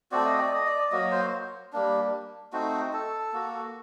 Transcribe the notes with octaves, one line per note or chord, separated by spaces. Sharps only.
A3 C4 F#4 D5
D#5
D5
D#5
D5
F#3 A#3 F#4 D#5
C5
G3 A#3 D4
A3 C4 D#4 F#4
A4
A#3 F#4